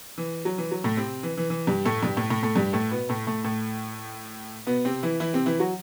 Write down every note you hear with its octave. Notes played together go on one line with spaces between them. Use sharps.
E3
F#3
E3
F#3
A2 A3
C3 C4
E3
E3
E3
G2 G3
A2 A3
G2 G3
A2 A3
A2 A3
A2 A3
G2 G3
A2 A3
B2 B3
A2 A3
A2 A3
A2 A3
B2 B3
C3 C4
E3 E4
E3 E4
C3 C4
E3 E4
F#3 F#4